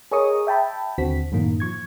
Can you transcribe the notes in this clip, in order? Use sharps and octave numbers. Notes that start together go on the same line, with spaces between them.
G#4 A#4 C#5 D#5 C#6 D#6
E5 G5 A5 B5
D#2 D3 C4 F#4 B6
F#2 A2 D#3 A#3
F3 C#6 G#6